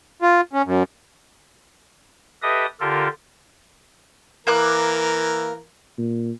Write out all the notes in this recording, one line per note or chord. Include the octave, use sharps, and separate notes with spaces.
F4
C#4
F#2
G4 A4 B4 D#5 E5 D#6
D3 F4 G4 A4 A#4
E3 A#3 A#4 D6 F#6
A#2